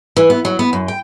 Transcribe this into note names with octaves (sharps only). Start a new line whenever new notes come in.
E3
B3
F#3
B3
F#2
G5